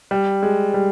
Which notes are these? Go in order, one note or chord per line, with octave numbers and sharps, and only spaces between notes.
G3
G#3
G3